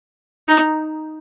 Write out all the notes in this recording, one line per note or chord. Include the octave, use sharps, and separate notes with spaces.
D#4